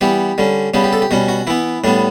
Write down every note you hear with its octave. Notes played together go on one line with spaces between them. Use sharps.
E3 G3 B3 G4
D3 G3 C#4
C#3 G3 B3 G4
G4
A4
G4
B2 G3 C#4 F#4
F#4
E3 B3 E4
A2 G3 B3 D4